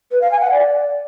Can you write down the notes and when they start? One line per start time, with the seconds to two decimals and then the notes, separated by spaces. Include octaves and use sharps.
0.11 B4
0.21 F5
0.31 G#5
0.41 F#5
0.51 D5